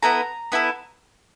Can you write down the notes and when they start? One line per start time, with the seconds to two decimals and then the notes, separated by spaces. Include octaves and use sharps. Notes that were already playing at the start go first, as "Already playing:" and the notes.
0.03 B3 E4 A4 A#5
0.52 B3 E4 A4